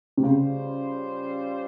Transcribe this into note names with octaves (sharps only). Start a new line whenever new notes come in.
C3
C#3 G3 C#4 F4 C5